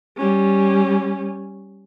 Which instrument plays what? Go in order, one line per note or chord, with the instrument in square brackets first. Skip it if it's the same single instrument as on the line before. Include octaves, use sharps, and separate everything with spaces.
[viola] G3 C#4